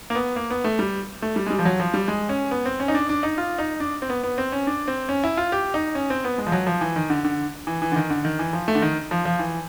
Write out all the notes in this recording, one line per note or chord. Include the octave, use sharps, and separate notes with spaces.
A#3
B3
A#3
B3
A3
G3
A3
G3
G#3
G3
F3
F#3
F3
G3
G#3
C#4
B3
C4
C#4
D#4
D4
D4
D#4
F4
D#4
D4
C4
B3
B3
C4
C#4
D4
C4
C#4
E4
F4
G4
D#4
C#4
C4
B3
G#3
F3
F#3
F3
E3
D#3
D3
D3
E3
E3
D3
D#3
D3
D#3
E3
F3
A3
D3
D#3
F3
F3
E3